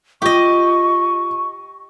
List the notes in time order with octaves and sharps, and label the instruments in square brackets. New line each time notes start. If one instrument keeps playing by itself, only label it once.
[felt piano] F4 [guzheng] G4 D#5 [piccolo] C#6